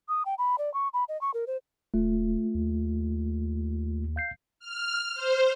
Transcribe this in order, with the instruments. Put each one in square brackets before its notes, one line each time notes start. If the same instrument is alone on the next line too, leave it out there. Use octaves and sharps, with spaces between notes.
[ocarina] D#6
G5
B5
D5
C#6
B5
D#5
C#6
A#4
C5
[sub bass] D#1 [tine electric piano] A3 F4
[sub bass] D#2
[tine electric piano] F5 G6 C7
[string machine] F6
C5